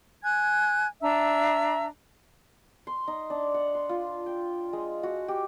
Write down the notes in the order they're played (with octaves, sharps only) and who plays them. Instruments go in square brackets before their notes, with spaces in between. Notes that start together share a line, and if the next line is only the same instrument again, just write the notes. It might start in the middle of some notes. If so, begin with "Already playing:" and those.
[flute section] G#5 F#6 G#6
D4 E5 A#5 E6
[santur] C6
D#4
D4
F#5
C6
F4
G5
G#3
F#4
G4